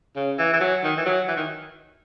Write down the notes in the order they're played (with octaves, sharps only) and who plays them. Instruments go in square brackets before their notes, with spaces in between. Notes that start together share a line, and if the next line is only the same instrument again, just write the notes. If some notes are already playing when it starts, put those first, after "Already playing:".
[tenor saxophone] C#3
E3
E3
F#3
D#3
E3
F#3
E3
D#3